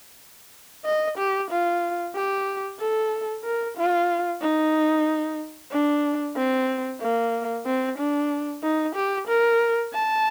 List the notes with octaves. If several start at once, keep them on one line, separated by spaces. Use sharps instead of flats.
D#5
G4
F4
G4
A4
A#4
F4
D#4
D4
C4
A#3
C4
D4
D#4
G4
A#4
A5